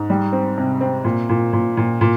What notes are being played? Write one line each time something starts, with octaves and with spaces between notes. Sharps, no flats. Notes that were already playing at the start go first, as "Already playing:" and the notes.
Already playing: G#2
G3
C4
C3
C4
A#2
A#2
A#2
A#2
A#2